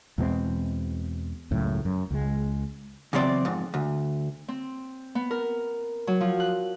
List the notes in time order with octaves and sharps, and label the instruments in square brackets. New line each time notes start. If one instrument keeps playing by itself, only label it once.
[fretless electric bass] E2 B2 G#3 C4
C#2 F#2 A2
F#2
C#2 G#3
[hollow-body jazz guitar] E2 C#3 F#3 C4 D5
F2 G#2
D2
[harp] C4
B3
A#4
F#3
F3
F#6